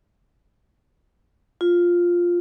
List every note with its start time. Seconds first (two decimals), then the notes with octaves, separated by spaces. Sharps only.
1.61 F4